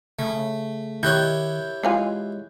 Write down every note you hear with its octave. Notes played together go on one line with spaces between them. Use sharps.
C#3 A3
D#3 E4 G4 C#5 F#6 G6
E3 G#3 F4 G#5